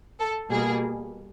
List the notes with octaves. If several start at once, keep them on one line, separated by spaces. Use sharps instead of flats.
A4
B2 G3 A#3 G#4